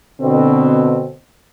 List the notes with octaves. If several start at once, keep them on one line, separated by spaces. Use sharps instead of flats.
B2 D3 C4